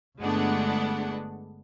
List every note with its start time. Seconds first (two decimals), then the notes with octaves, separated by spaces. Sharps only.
0.19 G1 G#3 A3 B3 D4 F#5